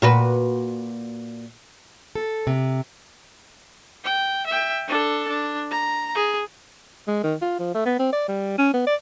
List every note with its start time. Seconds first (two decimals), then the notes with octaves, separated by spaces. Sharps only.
0.02 A#2 F#4 B4
2.15 A4
2.47 C3
4.04 G5
4.47 E5 G5
4.88 D4 A4
5.27 D4
5.71 A#5
6.15 G#4
7.07 G#3
7.23 D#3
7.42 F4
7.59 F3
7.74 A3
7.85 B3
7.99 C4
8.13 D5
8.28 G3
8.58 C#4
8.73 B3
8.86 D5